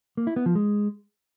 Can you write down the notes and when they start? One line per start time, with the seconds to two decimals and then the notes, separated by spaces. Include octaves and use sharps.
0.17 A#3
0.27 E4
0.36 B3
0.46 F3
0.55 G#3